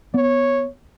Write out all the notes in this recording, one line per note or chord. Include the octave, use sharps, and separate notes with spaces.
B3 C#5